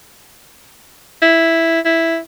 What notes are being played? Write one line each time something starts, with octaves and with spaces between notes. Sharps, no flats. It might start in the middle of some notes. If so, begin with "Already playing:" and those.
E4
E4